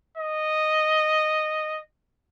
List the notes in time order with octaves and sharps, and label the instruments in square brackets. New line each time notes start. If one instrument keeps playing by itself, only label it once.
[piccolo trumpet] D#5